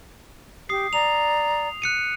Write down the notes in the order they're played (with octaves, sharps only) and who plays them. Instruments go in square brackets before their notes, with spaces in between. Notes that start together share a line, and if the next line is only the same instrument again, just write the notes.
[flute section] G4 [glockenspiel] D#6 C7
[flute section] D5 A#5 [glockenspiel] F7
[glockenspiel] F#6 C#7 D#7